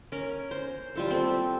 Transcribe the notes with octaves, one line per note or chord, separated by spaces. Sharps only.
C#4 A#4
C5
G3 F4 A4
C4 A4